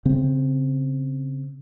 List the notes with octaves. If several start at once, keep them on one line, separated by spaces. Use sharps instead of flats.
C#3 C4